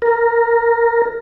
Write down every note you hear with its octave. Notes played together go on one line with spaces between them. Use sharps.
A#4